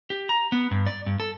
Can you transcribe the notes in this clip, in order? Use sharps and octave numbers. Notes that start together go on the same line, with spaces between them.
G4
A#5
B3
G2
D5
G2
A4